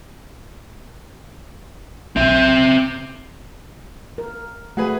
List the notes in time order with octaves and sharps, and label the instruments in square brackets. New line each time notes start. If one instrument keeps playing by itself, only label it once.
[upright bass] B1 [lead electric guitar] C4 E5
[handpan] A#4
[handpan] A3 [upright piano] F#4 G#4 B4